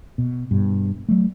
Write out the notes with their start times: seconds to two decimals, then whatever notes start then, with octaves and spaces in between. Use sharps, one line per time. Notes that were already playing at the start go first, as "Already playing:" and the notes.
0.18 B2
0.51 G2 B2
1.09 F#3 A3